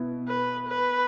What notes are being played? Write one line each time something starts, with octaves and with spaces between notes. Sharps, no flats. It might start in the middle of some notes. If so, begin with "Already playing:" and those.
Already playing: B2 B3 E4
B4
B4